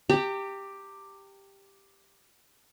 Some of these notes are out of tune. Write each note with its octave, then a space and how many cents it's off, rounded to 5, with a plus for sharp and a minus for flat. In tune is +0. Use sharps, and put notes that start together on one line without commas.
G4 +5 A#5 -40